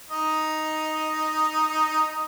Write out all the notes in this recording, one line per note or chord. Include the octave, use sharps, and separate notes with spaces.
D#4 D#5